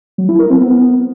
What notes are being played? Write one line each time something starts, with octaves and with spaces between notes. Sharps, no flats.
F#3
E4
A#4
C4
B3